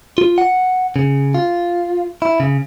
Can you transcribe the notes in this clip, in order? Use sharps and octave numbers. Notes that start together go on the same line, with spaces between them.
F4
F#5
C#3
F4
E4
C#3